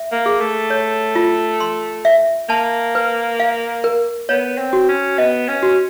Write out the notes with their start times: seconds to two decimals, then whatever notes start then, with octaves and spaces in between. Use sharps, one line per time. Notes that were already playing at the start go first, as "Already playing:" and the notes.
Already playing: E5
0.12 A#3
0.26 G#4
0.40 A3
0.70 C#5
1.15 F4
1.60 C6
2.05 E5
2.49 A#3 A5
2.95 B4
3.40 F5
3.84 A#4
4.29 B3 C#5
4.58 C4
4.73 F#4
4.89 C#4
5.18 B3 D#5
5.48 C#4
5.63 F#4